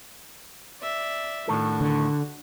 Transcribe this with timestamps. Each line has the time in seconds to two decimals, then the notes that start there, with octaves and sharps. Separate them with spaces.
0.82 D5 E5
1.48 A2 D#3 D4 F#4 A4
1.81 D3